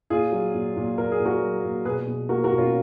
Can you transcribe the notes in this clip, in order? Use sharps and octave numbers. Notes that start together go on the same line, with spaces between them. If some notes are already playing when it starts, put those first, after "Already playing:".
A#2 F4 G#4
F#3
A#2
A#2
A#2 A#4
G#4
A#2
F#4 A#4
F#3
A#2
B2 G#4 B4
B2
A#3 F#4 A#4
F#4 A#4
B2
C#4 F4